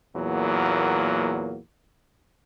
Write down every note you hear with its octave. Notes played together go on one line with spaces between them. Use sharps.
E2 A#2 F#3 A#3